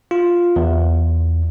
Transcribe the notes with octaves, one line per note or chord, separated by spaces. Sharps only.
F4
E2